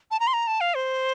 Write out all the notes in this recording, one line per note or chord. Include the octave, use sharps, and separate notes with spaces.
A5
A#5
C6
A#5
A5
F5
C5